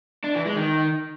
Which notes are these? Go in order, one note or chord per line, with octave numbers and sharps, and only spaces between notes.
D4
E3
G#3
D#3